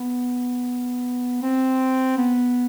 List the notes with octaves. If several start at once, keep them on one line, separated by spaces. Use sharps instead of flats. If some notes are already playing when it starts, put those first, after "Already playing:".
Already playing: B3
C4
B3